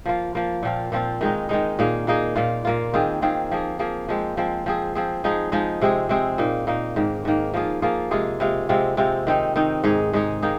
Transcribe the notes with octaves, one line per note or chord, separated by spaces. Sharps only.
F3 A#3 F4
F3 A#3 F4
A#2 F3 C4 F4
A#2 F3 C4 F4
D#3 G#3 D#4
D#3 G#3 D#4
A#2 A#3 D#4 G#4
A#2 A#3 D#4 G#4
A#2 A#3 F4
A#2 A#3 F4
D#3 C4 F4 G#4
D#3 C4 F4 G#4
F3 A#3 G#4
F3 A#3 G#4
F3 G#3 C4
F3 G#3 C4
F3 C4 G#4
F3 C4 G#4
F3 G#3 D#4 G#4
F3 G#3 D#4 G#4
C3 G#3 C4 G#4
C3 G#3 C4 G#4
A#2 A#3 D#4
A#2 A#3 D#4
G#2 D#3 A#3
G#2 D#3 A#3
F3 A#3 F4 G#4
F3 A#3 F4 G#4
C3 G#3 F4 G#4
C3 G#3 F4 G#4
C3 G#3 C4 F4
C3 G#3 C4 F4
D#3 C4 D#4
D#3 C4 D#4
G#2 G#3 D#4 G#4
G#2 G#3 D#4 G#4
D#3 A#3 D#4 G#4